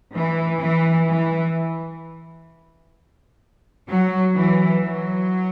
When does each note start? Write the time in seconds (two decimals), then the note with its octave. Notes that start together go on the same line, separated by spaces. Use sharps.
0.15 E3
0.62 E3
1.08 E3
3.88 F#3
4.35 E3
4.82 F#3